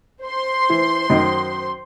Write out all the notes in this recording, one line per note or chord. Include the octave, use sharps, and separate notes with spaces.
C5 C6
E3
F#2 D#3 D#5